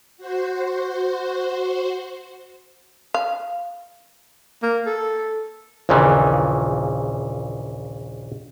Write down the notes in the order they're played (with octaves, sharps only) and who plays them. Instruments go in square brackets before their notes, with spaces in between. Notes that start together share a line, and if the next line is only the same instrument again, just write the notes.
[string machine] F#4 C5
[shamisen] F5
[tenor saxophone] A#3
A4
[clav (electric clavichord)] A#1 D#2 A#2 C#3 E3